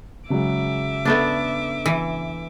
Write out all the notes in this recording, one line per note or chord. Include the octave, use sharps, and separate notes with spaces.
C#3 F#3 G#3 E5 D6
A3 B3 D4
E3